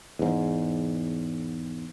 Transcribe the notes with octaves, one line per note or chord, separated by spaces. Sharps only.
E2 G#2